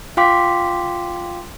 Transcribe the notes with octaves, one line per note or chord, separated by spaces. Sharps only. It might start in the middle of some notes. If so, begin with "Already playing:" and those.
F4 F5 G5 C6 D6 B6